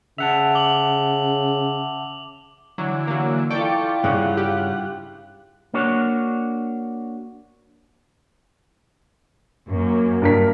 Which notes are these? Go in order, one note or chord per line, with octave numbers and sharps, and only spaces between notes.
C#3 E5 F#5 A5 F7
D6 F#7 G7
D3 E3 F#3
F#3 A#3
E4 F4 A4 D5 G5 C#6 D6
G2 C#3 C#4 F#5
G4
A#3 D4 F#4 C#5
F#2 A#3
G2 A#4 B6